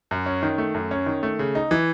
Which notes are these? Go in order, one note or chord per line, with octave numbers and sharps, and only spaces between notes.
F#2
C#4
D#3
A3
F#2
C#4
D#3
A3
C#3
D#4
E3